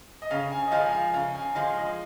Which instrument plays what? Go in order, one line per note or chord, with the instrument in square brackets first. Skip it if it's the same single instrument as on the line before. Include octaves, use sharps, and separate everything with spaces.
[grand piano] D#5
[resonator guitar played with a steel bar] C#3 [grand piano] F5
[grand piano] G#5
D#5
[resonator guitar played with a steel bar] F3 G#3 [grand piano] F5
[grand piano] G#5
F5
[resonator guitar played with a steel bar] C#3 [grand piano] F5
[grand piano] G#5
[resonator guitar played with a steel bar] F3 G#3 [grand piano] F5
[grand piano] D#5